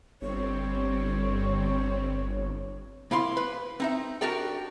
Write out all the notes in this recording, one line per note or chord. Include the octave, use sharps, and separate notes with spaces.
G1 G3 C4 C#5
A#3 E4 F5 C6
B4
C4 D#4 E5
D4 F#4 G4 A#4 D5 G5